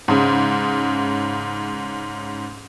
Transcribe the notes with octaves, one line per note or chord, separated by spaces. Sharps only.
G#2 C#3